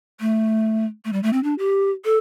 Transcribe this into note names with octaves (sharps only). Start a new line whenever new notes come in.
A3
A3
G3
A3
C4
D4
G4
A4